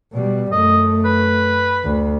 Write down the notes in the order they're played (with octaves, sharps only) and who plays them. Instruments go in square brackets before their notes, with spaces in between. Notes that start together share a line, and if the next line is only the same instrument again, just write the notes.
[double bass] B2 G3
[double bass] F#2 A3 [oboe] D#5
[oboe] B4
[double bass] D2